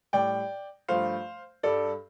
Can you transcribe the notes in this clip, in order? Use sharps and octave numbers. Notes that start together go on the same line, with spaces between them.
A2 G3 D5 G5
G2 F3 A3 C5 F5
G2 G3 A4 D5